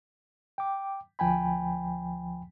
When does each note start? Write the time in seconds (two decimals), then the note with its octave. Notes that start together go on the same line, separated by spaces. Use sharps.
0.58 G5 D6
1.19 D2 F3 G5 G#5 B5